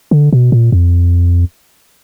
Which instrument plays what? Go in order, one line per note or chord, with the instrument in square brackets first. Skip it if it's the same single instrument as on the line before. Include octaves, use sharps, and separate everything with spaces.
[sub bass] D3
B2
A#2
F2